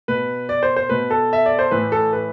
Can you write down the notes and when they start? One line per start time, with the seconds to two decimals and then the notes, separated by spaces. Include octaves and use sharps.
0.08 B2 B4
0.49 D5
0.63 C5
0.76 C5
0.89 B2 B4
1.10 A4
1.33 E5
1.46 D5
1.59 C5
1.71 A2 E3 B4
1.92 A4
2.13 B4